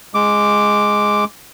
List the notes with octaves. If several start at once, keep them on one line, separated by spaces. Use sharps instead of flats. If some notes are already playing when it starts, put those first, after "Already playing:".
G#3 D6